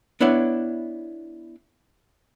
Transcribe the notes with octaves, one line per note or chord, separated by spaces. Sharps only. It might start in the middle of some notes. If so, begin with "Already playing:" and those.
B3 D4 E4 C#5 F#5